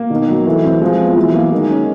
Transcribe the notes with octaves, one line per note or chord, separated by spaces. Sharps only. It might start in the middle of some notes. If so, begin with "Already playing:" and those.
Already playing: A#3
B2 D#3
F#3
E3 A3
C4
F3 G#3
B3
E3 F#3
A#3
D#3 G#3
C#4